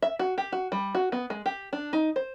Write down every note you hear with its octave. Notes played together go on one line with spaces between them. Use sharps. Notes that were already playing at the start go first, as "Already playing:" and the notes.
E5
F#4
G4
F#4
G3
F#4
B3
G#3
G4
D4
D#4
C5